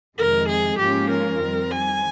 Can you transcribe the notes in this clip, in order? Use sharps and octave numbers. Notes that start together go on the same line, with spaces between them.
F2 C3 D#3 G#3 A#4
G#4
G#2 F3 A#3 C#4 F4 G4
A#4
F2 D#3 G3 C4
G#5